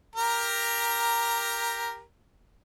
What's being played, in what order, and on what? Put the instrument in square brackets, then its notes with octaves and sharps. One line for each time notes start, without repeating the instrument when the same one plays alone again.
[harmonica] G4 A#4 A#5